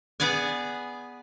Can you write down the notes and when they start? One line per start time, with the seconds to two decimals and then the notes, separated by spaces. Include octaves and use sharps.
0.20 B3 G#4 D5 G#5